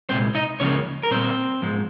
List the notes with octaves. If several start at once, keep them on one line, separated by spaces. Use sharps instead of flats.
C2 A#2 G#3 C4 C5
D#4 D#5
C#2 C#3 F3 A#3 C#4 C#5
A#4
A#2 G3 A#3 C4 C5
G#2 F3 G#3